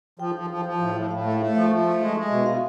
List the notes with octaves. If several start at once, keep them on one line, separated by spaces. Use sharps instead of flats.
F3 G5
F3
F3
F3
A2
A2
A2 F5
A3
A3
F3 E5
F3
A3
G#3
G#3
B2
B2 F5